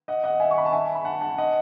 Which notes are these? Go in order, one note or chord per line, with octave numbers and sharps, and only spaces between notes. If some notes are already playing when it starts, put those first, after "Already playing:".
D#5 F#5
D#5 F#5
E5 G#5
C#6
B5
A5
E5 G#5
B5
F#5 A5
F#5 A5
D#5 F#5